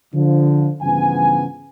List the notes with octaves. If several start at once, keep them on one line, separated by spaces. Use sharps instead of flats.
D3 F3
G2 C#3 E3 F3 B3 G#5